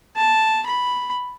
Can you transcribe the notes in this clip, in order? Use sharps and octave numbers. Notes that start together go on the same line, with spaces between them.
A5
B5